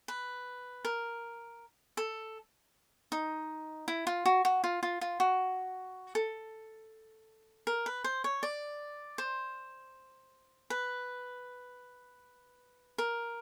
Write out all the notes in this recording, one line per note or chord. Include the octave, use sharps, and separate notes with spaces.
B4
A#4
A4
D#4
E4
F4
F#4
F#4
F4
F4
F4
F#4
A4
A#4
B4
C5
C#5
D5
C5
B4
A#4